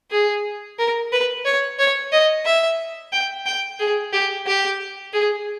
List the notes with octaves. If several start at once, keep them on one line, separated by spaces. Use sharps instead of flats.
G#4
A#4
B4
C#5
C#5
D#5
E5
G5
G5
G#4
G4
G4
G#4